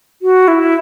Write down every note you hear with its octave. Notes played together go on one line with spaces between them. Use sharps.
F#4
E4